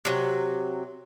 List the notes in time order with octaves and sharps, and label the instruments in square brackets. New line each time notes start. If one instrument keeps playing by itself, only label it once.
[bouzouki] C3 F#3